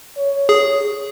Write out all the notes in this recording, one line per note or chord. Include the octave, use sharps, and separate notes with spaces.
C#5
G#4